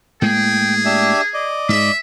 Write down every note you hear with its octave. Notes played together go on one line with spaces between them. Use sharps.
A2 G#3 A#3 G#4 G5
D4 G4 E5
D5 D#5
G#2 G#3 E5